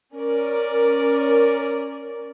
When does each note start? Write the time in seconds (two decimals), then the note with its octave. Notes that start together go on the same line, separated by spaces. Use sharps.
0.13 C#4 A#4 D5